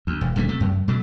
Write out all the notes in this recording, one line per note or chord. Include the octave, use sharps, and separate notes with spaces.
D2
E1
D#1 D3 F3 A3
C3 A3
F#2
B2 F#3 A3